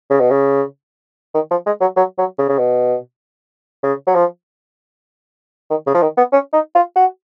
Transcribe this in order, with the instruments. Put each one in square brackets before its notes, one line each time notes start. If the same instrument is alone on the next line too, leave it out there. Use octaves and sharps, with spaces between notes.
[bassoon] C#3
B2
C#3
D#3
F3
G#3
F#3
F#3
F#3
C#3
C#3
B2
C#3
F#3
F3
D#3
C#3
F3
D#3
B3
C#4
D#4
F4
F#4